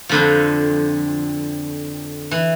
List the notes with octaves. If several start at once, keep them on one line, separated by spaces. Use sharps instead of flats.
F2 D3 F3
E3